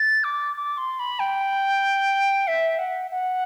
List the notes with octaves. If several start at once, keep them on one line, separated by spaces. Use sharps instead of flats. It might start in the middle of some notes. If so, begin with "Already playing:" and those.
Already playing: A6
D6
D6
C6
B5
G5
E5
F#5
F#5